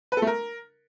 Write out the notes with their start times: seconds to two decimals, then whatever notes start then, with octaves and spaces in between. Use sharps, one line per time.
0.12 B4
0.17 A4
0.22 A3
0.27 A#4